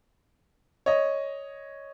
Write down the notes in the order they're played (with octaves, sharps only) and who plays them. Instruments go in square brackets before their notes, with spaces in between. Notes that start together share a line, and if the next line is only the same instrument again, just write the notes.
[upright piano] C#5 D#5